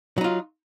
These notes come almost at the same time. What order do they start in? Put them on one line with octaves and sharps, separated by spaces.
F#3 D#4 F4